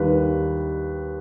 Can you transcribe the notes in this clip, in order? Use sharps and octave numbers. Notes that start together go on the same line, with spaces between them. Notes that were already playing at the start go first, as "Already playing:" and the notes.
Already playing: D#2 D#3 G3 B4